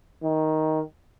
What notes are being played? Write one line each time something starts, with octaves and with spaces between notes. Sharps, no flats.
D#3